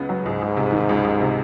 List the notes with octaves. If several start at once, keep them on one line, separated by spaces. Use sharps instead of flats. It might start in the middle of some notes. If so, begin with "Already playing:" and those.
Already playing: C#2 C#3 B3
F#3
C#2 G#2
C#2
C3
D#3
C#2
C#2
C3